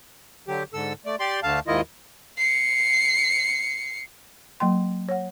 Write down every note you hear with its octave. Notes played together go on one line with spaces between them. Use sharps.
D3 F#3 G4
G#2 D3 A4 E6
A3 D5
G4 D5 C6
D2 D3 A3 F5 A5
D#2 G#2 D#3 E4 F4 D#5
C7 C#7
F#3 A#3 G5 C6
C#5 F#5